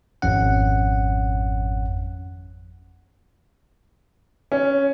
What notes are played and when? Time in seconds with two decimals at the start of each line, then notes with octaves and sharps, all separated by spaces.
0.22 G#1 F2 C#4 F#5
4.52 C#4